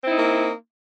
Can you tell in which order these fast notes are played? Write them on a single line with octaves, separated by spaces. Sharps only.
C4 E4 D#4 A#3